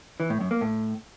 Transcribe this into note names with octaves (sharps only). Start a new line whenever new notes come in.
E3
A2
F#2
A#3
A2